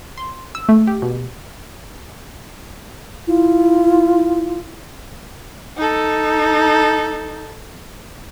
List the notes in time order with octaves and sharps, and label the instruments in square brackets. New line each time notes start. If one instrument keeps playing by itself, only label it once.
[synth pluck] C6
E6
A3
G4
B2
[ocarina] E4 [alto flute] F4
[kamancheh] D#4 A4